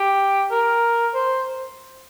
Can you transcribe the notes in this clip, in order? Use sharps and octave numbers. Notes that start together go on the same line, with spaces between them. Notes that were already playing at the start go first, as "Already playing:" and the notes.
Already playing: G4
A#4
C5